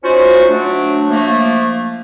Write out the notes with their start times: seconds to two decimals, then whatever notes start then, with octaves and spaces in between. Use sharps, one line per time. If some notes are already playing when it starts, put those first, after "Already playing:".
0.04 C#4 D#4 F4 F#4 C5
0.49 F#3 A3 D4
1.10 F3 A3 A#3